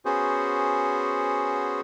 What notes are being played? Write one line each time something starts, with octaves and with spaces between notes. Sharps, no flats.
B3 C#4 F#4 G#4 C5